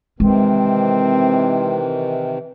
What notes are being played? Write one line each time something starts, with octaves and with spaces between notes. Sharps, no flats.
C3 D#3 E3 G#3 C4